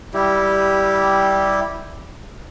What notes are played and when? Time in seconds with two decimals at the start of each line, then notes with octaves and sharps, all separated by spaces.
0.14 G3 E4 G4